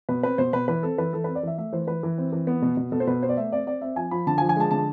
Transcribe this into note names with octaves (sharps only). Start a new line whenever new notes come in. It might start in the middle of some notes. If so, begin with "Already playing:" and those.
B2 B4
C4 B4
B2 C5
B2 B4
E3 B4
C4 A4
E3 B4
E3 A4
C4 B4
D5
E3 E5
A3 E5
E3 C5
E3 B4
E3
C4
E3
B3
B2
B2
B2 A4
C5
B2 B4
B3 C5
D5
A3 E5
C4 D5
C4 D5
C4 E5
F3 G#5
F3 B5
D3 A5
G#5
F3
G#5
G#3 A5
D3 A5